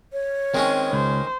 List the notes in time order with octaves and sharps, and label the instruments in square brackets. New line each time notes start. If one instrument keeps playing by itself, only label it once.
[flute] C#5
[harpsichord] D#3 G#3 C#4 [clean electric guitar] C4
[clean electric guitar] C#2 [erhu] C5